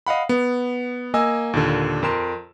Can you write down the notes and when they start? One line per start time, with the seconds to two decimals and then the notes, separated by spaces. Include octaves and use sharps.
0.07 D#5 F5 F#5 B5
0.29 B3
1.14 A#3 D#5 G#5 E6
1.53 D#2 A#2 D3
2.03 F2 A#4 C6 E7